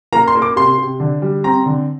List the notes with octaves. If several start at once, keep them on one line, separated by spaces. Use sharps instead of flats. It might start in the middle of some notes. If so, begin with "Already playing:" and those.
A#3 A#5
C6
A#3
D6
C3 C6
C3
D3
G3
C4 A#5
D3